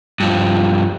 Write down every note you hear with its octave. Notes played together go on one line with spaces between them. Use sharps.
G2 F3